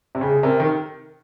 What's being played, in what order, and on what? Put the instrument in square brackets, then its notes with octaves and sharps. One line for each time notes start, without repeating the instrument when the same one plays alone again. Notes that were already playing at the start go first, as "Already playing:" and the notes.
[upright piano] C3
[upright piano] C#3 [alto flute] G#4
[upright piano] C3 [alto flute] A#4
[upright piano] D#3